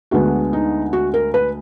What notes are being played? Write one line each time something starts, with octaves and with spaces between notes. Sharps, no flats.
D2 D3 G#3 B3 F#4
D#4
F#4
A#4
B4